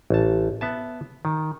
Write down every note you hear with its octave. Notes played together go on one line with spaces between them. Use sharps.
A1 A5
B3 E5 A5
D#3